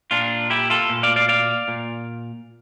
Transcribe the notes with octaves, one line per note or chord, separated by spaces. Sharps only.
A#2 D4 F4
E4 G4
F4 A4
A#2
D5 F5
D5 F5
D5 F5
A#2